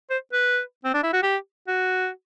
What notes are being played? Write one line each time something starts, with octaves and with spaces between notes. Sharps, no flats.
C5
B4
C4
D4
E4
F#4
G4
F#4